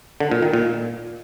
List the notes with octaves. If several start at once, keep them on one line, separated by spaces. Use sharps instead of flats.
D3
A#2
D#3
A#2